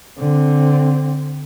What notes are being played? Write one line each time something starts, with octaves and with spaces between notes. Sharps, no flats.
D3 C4